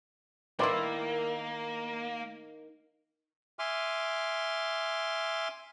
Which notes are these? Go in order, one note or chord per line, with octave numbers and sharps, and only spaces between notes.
D#3 A#3 E4 B4 D5 C6
E5 G#5 C6 D6 F6